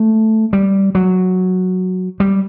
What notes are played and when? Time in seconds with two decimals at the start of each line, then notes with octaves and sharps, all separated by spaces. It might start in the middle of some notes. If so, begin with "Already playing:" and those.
Already playing: A3
0.53 G3
0.95 F#3
2.20 G3